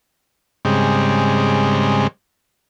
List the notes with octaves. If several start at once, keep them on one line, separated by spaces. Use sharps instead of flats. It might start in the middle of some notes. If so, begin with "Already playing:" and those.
G#2 C#3 G3 G#3 C4